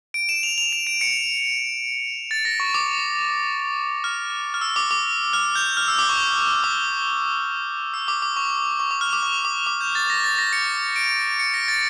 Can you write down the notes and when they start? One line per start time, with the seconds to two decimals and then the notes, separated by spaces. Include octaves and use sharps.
0.14 D7
0.29 E7
0.43 F7
0.58 F7
0.73 E7
0.87 D7
1.01 C#7
2.31 A6
2.45 A#6
2.60 C#6
2.74 D6
4.04 F6
4.54 F6
4.61 E6
4.76 D6
4.91 D6
5.33 F6
5.55 G6
5.77 F6
5.88 E6
5.98 D6
6.09 C#6
6.64 D6
7.94 E6
8.08 D6
8.22 D6
8.37 C#6
8.79 C#6
8.91 D6
9.01 F6
9.13 D6
9.23 C#6
9.45 D6
9.67 D6
9.81 G6
9.95 A6
10.10 A#6
10.24 A6
10.39 A#6
10.53 C#7
10.96 D7
11.39 C#7
11.54 A#6
11.68 A6